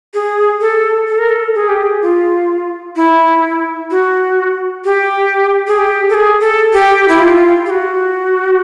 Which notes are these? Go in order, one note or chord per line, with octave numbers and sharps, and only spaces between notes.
G#4
A4
A4
A#4
A4
G#4
G4
G#4
F4
E4
F#4
G4
G#4
G4
A4
G#4
A4
G4
E4
F4
G4
F#4